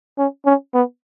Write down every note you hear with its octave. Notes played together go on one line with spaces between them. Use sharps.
C#4
C#4
B3